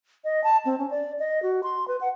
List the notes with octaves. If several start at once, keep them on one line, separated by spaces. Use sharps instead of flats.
D#5
A5
C4
C#4
D5
D#5
F#4
C6
B4
F#5